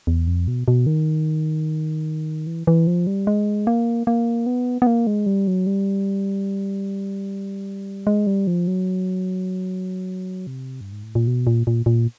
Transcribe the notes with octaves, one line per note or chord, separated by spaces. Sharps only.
E2
F2
B2
B2
D#3
E3
E3
F3
G3
G#3
A#3
A#3
B3
B3
A#3
G#3
G3
F#3
G3
G#3
G3
F3
F#3
C3
G2
G#2
A2
A#2
B2
A#2
A#2
A#2